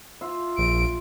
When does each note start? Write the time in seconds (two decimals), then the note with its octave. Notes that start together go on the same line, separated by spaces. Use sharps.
0.21 F4 E5
0.58 A#1 D7